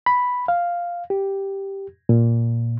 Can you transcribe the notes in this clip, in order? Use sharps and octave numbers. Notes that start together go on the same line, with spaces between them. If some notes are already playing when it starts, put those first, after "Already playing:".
B5
F5
G4
A#2